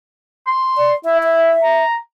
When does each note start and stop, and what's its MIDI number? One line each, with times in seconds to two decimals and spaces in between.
0.47 0.92 84
0.78 0.94 74
1.05 1.53 64
1.05 1.18 76
1.24 1.84 76
1.63 1.96 82